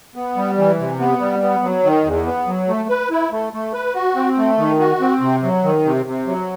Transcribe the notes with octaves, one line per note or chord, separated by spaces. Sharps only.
B3
G3
E3
C3
B3
G3
B3
F#3
D#3
E2
B3
F#3
A3
B4
E4
A3
A3
B4
F#4
C4
A3
D#3
F#4
C4
C3
F#3
D#3
C3
C3
F#3